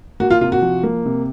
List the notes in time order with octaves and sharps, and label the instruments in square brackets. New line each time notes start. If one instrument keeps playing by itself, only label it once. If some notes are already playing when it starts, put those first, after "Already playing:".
[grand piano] A#3 [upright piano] F#4
[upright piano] F4
[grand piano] C3 [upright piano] F4
[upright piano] F#4
[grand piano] F3
A#3
C3